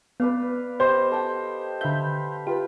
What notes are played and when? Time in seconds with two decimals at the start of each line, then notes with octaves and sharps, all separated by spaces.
0.20 B3 B4 D5 F5
0.80 G4 C5 D#5
1.11 A4 G5
1.81 D3 E5 F5 B5 G6
2.47 F4 G4 B4 B5